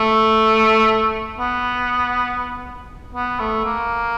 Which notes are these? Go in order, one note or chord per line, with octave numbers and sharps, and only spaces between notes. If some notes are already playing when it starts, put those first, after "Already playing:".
Already playing: A3
B3
B3
A3
A#3